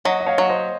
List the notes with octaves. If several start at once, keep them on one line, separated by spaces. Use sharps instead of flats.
F#3 D#5 F#5
D#5
C#5 F5
F#3
C5 D#5